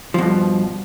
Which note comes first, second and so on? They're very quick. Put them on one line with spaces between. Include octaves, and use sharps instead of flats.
F3 B2 G2